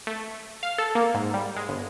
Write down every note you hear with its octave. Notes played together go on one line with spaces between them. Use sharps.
A3
F5
A4
A#3
G#2
G3
G#3
G1